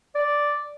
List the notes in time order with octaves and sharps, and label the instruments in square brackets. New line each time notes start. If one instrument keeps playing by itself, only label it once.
[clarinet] D5